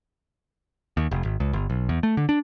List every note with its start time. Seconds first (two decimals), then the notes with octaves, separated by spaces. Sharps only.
0.97 D#2
1.11 F1
1.25 G#1
1.40 C#2
1.53 G1
1.70 B1
1.89 E2
2.03 A3
2.17 D3
2.29 D4